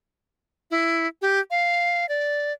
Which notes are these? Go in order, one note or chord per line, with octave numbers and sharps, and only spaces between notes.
E4
G4
F5
D5